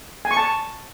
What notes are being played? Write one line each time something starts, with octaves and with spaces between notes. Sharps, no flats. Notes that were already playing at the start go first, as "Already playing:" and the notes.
G#5
C#6
A5